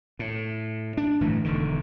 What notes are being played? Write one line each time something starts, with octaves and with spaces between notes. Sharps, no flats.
A2
D4
G1 A2 E3 A3
E1 D3 D#3